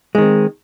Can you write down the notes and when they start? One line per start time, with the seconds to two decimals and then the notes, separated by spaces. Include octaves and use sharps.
0.15 G#3
0.18 D#3
0.22 C4